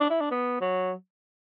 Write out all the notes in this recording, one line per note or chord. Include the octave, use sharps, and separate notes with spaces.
D4
E4
D4
B3
F#3